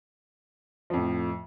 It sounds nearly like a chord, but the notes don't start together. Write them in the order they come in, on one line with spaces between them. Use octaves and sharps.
F3 F2 A2